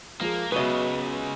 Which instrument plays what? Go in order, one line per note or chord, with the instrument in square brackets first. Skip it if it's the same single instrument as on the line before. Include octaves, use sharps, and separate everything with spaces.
[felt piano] F3 G#3 [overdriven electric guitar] A#3
[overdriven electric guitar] C#3 G#3 [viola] F#3 B3 [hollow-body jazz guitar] B4 D#5 [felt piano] E5 C#6